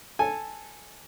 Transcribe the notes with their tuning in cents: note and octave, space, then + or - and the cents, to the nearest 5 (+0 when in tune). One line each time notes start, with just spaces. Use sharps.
A4 -5 G#5 -10